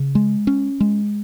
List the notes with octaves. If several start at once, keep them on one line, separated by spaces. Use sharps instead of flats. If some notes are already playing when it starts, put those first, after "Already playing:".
Already playing: C#3
G#3
C#4
G#3